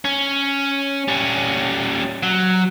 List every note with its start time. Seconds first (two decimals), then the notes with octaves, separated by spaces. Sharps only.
0.05 C#4
1.08 G3 C#4
2.23 F#3